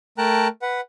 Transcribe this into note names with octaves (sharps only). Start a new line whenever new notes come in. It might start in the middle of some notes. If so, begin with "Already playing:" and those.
A3 A#4 G5 A5 A#5 F#6
B4 F#5